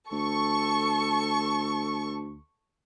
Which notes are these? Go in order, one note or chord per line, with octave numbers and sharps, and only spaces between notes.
D2 A4 C#6